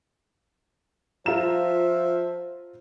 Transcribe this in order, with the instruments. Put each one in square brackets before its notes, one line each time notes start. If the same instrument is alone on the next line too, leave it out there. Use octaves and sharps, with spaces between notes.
[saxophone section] F3 E5 [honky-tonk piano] F4 A#5 E7 [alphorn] C5